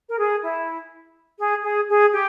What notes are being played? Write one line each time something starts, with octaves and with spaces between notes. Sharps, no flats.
A#4
G#4
E4
G#4
G#4
G#4
G4